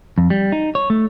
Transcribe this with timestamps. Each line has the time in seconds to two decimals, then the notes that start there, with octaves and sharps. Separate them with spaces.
0.18 F2
0.30 G3
0.52 D#4
0.75 C#5
0.90 A3